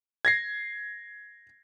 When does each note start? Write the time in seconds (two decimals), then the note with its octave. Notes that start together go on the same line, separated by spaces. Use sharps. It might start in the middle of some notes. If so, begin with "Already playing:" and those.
0.25 G#6 A#6 C7